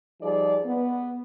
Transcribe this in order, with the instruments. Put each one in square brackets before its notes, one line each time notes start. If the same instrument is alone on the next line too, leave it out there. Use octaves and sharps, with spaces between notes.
[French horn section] F3 G3 D#4 G#4 D5
B3